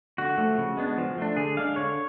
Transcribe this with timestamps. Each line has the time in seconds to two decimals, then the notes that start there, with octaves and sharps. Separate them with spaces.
0.18 D3 F#4
0.38 F3 A3
0.58 C#3
0.77 G#3 B3 D4
0.98 F3
1.18 A3 D4
1.37 D3 G#4
1.57 G#3 D4 F5
1.76 D3 C#5